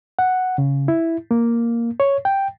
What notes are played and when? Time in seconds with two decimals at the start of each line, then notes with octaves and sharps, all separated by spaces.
0.19 F#5
0.58 C#3
0.88 E4
1.31 A#3
2.00 C#5
2.25 G5